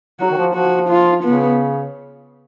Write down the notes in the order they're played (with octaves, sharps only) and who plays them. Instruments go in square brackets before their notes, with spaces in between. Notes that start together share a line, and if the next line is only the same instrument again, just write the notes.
[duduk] F#3 [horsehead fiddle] F#4
[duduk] D#3
F3
[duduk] F3 [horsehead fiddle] F#4
[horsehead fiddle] F4
[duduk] C#3 [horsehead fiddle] B3